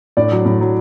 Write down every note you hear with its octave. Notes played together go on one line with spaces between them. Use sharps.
A2 D4 D5
F#3
A2
F#3